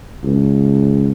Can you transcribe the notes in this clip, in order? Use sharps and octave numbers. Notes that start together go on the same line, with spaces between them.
C#2